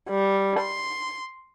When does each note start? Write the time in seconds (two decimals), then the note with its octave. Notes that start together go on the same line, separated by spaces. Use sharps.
0.10 G3
0.61 C6